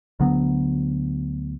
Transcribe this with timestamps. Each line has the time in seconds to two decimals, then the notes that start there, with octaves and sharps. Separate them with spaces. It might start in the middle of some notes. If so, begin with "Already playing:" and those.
0.20 D2 D3 F#3 B3